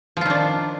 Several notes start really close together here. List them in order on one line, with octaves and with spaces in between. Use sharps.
F3 F4 D#3 D4